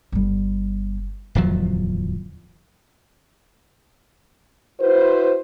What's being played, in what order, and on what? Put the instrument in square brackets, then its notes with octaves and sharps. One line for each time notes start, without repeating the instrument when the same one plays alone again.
[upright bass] G1 G3
[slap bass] D1 E2 F3 F#3
[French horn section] E4 F#4 B4 C5